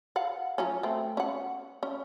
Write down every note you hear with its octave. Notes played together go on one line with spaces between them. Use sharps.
F5 F#5
F3 F#3 C#4
A3 C4
C#4 F#5
C#4